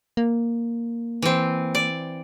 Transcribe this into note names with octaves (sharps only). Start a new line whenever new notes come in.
A#3
E3 C4
D5